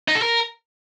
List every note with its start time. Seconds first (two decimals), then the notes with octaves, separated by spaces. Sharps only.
0.08 D#4
0.15 A4
0.22 A#4